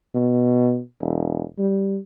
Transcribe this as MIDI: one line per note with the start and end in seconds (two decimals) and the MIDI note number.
0.15 0.80 47
1.01 1.43 28
1.58 1.98 55